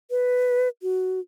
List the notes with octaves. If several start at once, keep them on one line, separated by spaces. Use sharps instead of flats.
B4
F#4